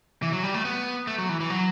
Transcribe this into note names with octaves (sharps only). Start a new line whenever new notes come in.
E3
F#3
G3
A3
B3
A3
F#3
E3
E3
F#3